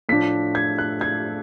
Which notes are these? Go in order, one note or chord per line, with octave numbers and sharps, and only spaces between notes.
A2 F3 A3 D4 B6
G#6
F#6
G#6